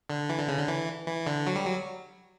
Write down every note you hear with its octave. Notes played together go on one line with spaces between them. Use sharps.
D3
E3
D3
C#3
D3
E3
E3
D3
F#3
G3
F#3